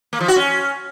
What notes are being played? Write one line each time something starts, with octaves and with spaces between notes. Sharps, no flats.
A#3
F3
F#4
C#4